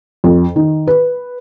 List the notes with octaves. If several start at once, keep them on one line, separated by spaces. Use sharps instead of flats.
F2
D#3
B4